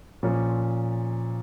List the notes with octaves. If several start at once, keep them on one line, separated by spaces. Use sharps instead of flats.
A#2 F3 C#4